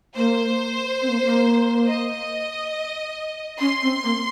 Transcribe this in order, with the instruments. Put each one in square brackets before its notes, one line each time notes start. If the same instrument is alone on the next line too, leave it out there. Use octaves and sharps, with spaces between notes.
[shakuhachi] A#3 [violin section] C5
[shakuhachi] C4
A#3
A#3
[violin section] D#5
[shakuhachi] C#4 [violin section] C6
[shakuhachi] C4
A#3